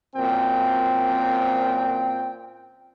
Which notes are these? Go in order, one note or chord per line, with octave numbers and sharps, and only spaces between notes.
F#2 A#2 C4 G5